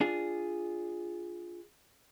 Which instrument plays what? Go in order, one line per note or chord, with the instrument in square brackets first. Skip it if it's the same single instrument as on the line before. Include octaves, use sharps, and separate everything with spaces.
[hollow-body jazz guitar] D4 F4 G#4